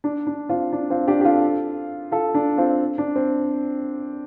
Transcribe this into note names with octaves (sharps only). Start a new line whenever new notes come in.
D4
D4
C4 F4
D4
C4 F4
D4 G4
G4
F4 A4
F4 A4
D4
C4 F4
D4
C4